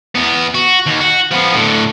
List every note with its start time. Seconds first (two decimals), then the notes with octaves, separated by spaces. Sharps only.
0.15 E2 B3
0.55 F#4
0.86 D#2
1.00 F#4
1.31 F3 B3
1.54 A2 D3